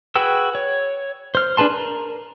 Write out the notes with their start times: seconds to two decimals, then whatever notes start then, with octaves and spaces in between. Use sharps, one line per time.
0.15 F#4 G#4 B4 G5 E6
0.55 C#5
1.35 C5 F6
1.57 D4 G#4 B4 A5 C6
1.70 A#4